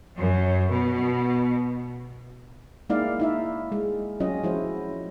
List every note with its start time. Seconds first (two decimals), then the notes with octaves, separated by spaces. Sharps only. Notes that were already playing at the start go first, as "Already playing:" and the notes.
0.18 F#2
0.70 B2
2.89 G#3 A#3 D#4 E4 D5 F5
3.20 D#4 E4 E5
3.72 G#3
4.20 F#3 C#4 F4 D#5
4.43 F3 G#3 E4 F#4 C5